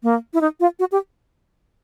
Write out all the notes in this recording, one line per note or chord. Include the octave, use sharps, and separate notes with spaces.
A#3
E4
D#4
F4
F#4
G4